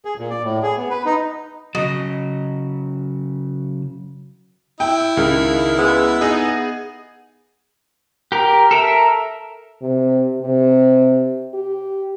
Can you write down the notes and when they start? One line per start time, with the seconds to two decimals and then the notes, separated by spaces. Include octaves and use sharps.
0.05 G#4
0.18 A#2
0.30 D5
0.43 A2
0.63 G#4
0.77 B3
0.90 B4
1.06 D#4
1.75 C#3 F#3 D#5
4.80 E4 G5
5.17 C#2 D#3
5.78 G#3 B3
6.21 D#4 G#4
8.32 G4 A#4
8.71 A4 A#4 E5
9.82 C3
10.42 C3
11.54 G4